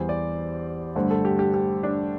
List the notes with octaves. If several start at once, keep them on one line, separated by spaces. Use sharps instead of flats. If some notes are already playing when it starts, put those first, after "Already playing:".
Already playing: E2 E3 G3 C5
D5
G2 D3 A3 C5
A4
G4
G4
G4
D4